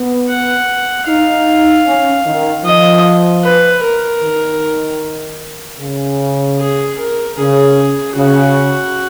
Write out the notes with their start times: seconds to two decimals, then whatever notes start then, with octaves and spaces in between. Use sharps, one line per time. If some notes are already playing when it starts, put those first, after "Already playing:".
Already playing: B3
0.29 F#5
1.07 D#4 F5
1.86 C#4
2.26 D#3
2.65 F3 D#5
3.44 B4
3.83 A#4
4.23 D#3
5.80 C#3
6.59 G#4
6.99 A#4
7.38 C#3 G#4
8.17 C#3 F#4